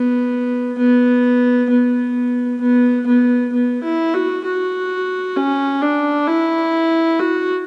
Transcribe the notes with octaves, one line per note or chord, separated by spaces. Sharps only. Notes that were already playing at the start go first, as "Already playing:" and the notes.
Already playing: B3
B3
B3
B3
B3
B3
E4
F#4
F#4
C#4
D4
E4
F#4